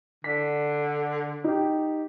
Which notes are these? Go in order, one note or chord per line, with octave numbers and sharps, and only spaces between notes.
D3 B6
D#4 G4